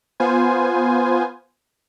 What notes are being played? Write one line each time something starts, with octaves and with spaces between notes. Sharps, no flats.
B3 F4 C5 G#5